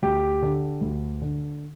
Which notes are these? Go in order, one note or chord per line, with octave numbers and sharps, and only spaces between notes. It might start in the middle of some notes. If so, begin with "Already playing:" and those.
D2 G4
D3
D2
D3